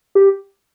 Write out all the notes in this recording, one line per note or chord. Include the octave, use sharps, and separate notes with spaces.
G4